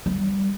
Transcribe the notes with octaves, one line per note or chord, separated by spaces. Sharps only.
G3